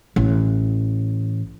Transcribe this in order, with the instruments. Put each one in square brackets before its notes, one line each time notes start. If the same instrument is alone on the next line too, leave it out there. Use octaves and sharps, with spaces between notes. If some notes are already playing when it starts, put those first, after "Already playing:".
[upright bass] A1